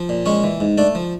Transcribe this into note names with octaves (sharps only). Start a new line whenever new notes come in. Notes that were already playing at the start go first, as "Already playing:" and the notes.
Already playing: F3
A#2
G#3 C#4 C#5
E3
G#2
A3 D4 D5
F3